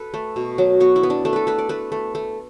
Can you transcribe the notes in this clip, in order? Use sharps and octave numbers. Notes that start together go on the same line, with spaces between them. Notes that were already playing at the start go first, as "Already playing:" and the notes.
Already playing: A4 B4
A3
B2
F#3
B3 F#4
E4
B3
D4
A3 D4
A4 B4
A3 B4
D5
A3 B4
A3
A3